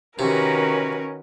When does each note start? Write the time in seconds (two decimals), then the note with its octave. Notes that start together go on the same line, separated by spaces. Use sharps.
0.19 C3 D#3 C#4 F#4 A#4 B4